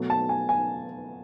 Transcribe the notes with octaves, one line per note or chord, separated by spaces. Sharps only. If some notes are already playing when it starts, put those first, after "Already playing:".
Already playing: B2 F#3 A3
A5
G#5
G#5